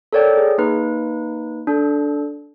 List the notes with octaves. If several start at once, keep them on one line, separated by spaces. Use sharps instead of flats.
A4 A#4 C#5 D5 G5
G#4
A#3 D#4 B4
D4 A4